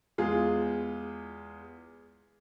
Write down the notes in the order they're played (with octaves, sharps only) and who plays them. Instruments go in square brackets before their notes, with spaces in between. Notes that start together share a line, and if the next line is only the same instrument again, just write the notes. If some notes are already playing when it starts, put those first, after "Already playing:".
[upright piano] E2 G#3 F4 G#4